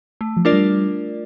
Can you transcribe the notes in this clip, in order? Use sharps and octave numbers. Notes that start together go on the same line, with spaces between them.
A3
F3
D4 F4 A#4 D5
G3